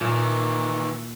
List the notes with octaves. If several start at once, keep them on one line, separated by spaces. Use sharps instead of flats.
A#2 D#3 E3